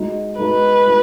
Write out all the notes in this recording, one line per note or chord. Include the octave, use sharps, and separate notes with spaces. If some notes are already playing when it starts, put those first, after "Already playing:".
Already playing: G#3 D#4 F#4
G#3 D#4 F#4 B4
G#3 D#4 F#4